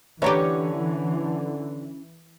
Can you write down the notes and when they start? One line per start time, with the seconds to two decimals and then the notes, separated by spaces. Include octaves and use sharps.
0.22 D3 E3 C#4 D4 G4 B4 C#5 A#5